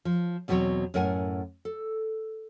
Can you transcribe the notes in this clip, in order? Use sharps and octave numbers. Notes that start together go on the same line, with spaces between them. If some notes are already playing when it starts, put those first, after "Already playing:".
F3
E2 B2 F#3 A#3 C4 C#5
F#2 A2 A#4 F#5 G#5
A4